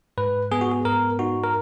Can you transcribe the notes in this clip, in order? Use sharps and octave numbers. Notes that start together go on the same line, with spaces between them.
G#2 B4
B3 G#4
F#4
G#4
G#2 A#4
D#4 F#4
A#4